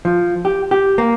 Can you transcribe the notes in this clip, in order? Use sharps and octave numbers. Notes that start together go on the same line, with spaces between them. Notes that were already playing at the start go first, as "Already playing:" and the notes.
F3
G4
G4
A#3